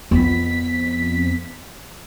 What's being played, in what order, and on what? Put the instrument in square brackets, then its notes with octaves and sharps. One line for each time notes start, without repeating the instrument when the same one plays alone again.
[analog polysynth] F2 B6 [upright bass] B3